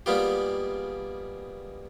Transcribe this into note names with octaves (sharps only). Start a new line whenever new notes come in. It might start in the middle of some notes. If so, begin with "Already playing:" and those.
G3 G#3 A#3 B3 F4 G4